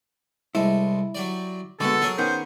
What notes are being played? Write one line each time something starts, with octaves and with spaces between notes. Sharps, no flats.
C2 G#3 E4 A4
F#3 G4 D5
D3 G#3 B3 F#4 A4
F#3 G#4 A#4 C#5
D#3 B3 C#4 C5